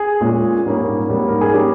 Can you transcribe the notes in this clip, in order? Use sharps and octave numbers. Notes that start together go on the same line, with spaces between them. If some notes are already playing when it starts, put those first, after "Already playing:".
Already playing: G#4
A#2 G#3 C#4
G#2 G3 A#3 C#4
G#2 G3 A#3 C#4
A#4
G#4
G3 A#3 C#4 G4